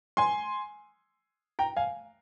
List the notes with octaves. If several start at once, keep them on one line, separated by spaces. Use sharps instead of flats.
G#5 C6
G5 A#5
F5 G#5